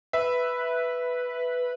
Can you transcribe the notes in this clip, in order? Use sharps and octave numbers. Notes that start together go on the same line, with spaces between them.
B4 E5